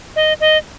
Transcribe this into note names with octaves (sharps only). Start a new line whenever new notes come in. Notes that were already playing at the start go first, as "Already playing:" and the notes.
D#5
D#5